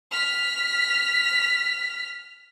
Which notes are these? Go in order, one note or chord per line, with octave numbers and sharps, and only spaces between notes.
F6 B6